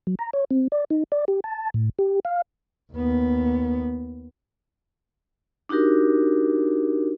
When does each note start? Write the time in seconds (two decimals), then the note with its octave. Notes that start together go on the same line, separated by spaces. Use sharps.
0.07 F#3
0.19 A#5
0.33 C#5
0.51 C4
0.72 D5
0.90 D#4
1.12 D5
1.28 G4
1.44 A5
1.74 A2
1.99 G4
2.25 F5
2.93 D#2 B3
5.69 D4 D#4 F#4 G4 A#4